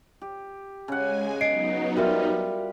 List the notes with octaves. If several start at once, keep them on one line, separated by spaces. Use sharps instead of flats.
G4
C#3 G#3 F#5 G#5
F#3 B3 D#4 D#5 C7 D7
G3 F4 F#4 A#4 E5